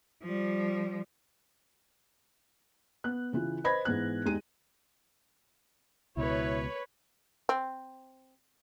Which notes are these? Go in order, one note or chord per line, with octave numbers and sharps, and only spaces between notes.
F3 G3
B3 F#6
C#3 E3 F4
B4 C5 D#5 B5 G#6 A#6
G#2 E3 B3 F#6
E2 G#3 D#4 G4 D#7
C#2 B2 E4 B4 C#5
C4